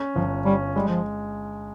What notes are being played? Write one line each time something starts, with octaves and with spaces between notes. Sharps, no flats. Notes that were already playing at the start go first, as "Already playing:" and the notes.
Already playing: C#4
G1 F3
G3 C#4
G3 G#3
F3